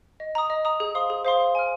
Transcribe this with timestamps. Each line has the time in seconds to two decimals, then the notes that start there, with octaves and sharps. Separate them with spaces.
0.20 D#5
0.35 A#5 D#6
0.50 D#5
0.65 A#5 D#6
0.80 G#4
0.95 C5 F5 C6 D#6
1.10 G#4
1.25 C5 F5 C6 D#6
1.40 F5
1.55 G#5 F6